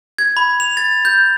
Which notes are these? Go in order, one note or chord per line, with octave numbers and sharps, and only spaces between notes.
G#6
B5
F7
A6
G6